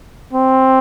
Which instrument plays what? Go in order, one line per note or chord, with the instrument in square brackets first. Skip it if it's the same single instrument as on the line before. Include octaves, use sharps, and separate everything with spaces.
[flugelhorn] C4